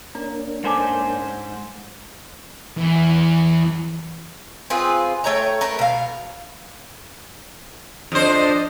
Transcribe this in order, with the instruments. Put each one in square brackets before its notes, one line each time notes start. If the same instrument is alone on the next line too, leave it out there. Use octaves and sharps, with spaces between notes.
[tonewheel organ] A#3 C#4 D4 [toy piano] D5 A#5
[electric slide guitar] G#2 C5 G#5 [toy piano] A4 A5 D6
[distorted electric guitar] E2
[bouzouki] C4 F4 G#4 B4
A3 C#5 G5 A#5
A3 A#4 B4
B2 F5
[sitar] F2 C5 [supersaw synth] D4 D#5